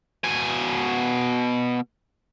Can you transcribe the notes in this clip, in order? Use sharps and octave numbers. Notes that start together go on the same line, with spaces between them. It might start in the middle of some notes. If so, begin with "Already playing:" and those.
B2 G#5